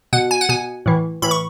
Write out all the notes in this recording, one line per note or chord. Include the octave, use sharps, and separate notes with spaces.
B2 F#5
G#5
F#5
B2 G#5
A2 E3
A2 E3 B5
C#6